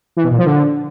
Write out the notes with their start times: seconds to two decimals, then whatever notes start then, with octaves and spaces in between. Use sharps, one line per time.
0.17 E3
0.24 B2
0.31 A#2
0.38 F3
0.46 D3